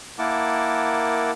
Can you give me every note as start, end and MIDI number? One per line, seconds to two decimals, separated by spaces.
0.19 1.31 58
0.19 1.31 64
0.19 1.31 70
0.19 1.31 78
0.19 1.31 81
0.19 1.31 86